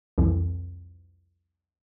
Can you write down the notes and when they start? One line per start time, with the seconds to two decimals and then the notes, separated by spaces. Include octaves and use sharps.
0.18 C2 F2 E3